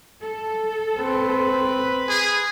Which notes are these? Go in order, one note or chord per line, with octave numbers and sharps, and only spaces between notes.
A4
C4 B4
G#4